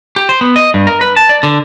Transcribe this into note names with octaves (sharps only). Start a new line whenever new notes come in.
G4
C5
B3
D#5
G2
A#4
B4
A5
D5
D3